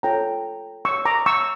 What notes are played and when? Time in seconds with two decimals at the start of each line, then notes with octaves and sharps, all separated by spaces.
0.03 F4 A4 C#5 G5 A#5
0.85 C#6 E6
1.05 A#5 D6
1.26 C#6 E6